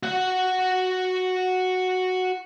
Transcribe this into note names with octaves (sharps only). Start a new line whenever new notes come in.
F#4 F#5